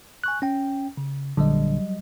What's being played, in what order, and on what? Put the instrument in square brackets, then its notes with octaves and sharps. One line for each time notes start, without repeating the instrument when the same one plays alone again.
[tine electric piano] G#5 C#6 F#6
C#4 G5
C#3
[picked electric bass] A#1 D3 [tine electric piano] F#3 G3 D#5